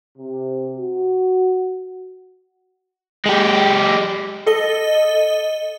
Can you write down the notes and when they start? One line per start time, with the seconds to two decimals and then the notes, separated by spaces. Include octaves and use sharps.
0.18 C3
0.78 F#4
3.26 G#3 G4
4.47 A4 D#5 G7